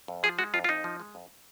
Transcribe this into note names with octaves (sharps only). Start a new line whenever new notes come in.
F2
F3 G#4
G#3 F#4
F2 F4
F4
F2 D#4
F3
G#3
F2